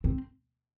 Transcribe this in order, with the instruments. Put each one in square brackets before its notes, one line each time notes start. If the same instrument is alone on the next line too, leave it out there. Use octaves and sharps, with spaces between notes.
[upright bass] C4